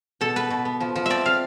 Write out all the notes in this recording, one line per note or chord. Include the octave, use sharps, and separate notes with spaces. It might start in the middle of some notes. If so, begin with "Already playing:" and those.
B2 A4
B3 B4
B2
B3
F3
F3
C4 D5 E5
C4 F5